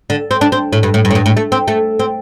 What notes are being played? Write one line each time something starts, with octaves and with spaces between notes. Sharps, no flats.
D3
C4
D4
C4
A2
G2
A2
G2
A2
G2
A2
A3
C4
A3
C4